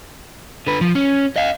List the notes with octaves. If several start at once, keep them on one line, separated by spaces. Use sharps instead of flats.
D3 B4
F3
C#4
D#5 F5